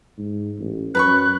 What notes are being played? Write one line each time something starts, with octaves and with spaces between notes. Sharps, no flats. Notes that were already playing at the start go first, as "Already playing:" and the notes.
G#2
A1
F#2 B4 B5 C#6 F#6